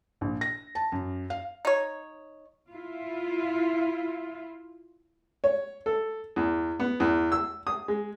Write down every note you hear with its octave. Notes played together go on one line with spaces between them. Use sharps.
A#1
A#6
A5
F#2
F5
D#4 C#5
E4 F4
C#5
A4
E2
B3
E2
E6
D#6
G#3